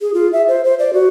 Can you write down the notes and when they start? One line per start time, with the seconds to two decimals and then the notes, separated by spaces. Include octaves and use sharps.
0.01 G#4
0.14 F4
0.33 E5
0.48 C5
0.64 C5
0.79 D5
0.94 F#4